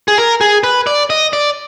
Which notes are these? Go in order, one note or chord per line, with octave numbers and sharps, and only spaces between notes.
G#4
A#4
G#4
B4
D5
D#5
D5